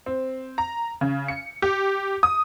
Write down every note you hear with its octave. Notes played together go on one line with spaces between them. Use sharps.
C4
A#5
C#3
C#7
G4
D#6